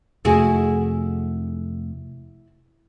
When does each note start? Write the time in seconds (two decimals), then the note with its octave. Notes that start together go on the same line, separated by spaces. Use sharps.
0.25 F2 C3 A3 E4 F#4 G#4